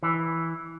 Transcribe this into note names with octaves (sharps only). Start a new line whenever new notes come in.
E3